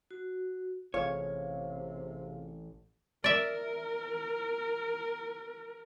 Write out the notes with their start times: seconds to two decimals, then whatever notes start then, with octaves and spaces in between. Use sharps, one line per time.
0.11 F#4
0.94 A1 C3 F4 G#4 C#5 F5
3.24 A#4 D5 E5